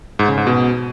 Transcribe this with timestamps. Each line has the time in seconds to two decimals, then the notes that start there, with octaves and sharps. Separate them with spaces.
0.19 G#2
0.28 C#3
0.38 G#2
0.47 B2